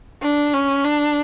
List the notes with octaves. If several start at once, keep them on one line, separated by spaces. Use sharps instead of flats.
D4
C#4
D4